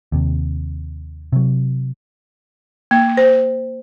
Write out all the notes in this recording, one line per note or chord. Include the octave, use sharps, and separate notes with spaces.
D#2 C3
C3 F#3
A#3
C5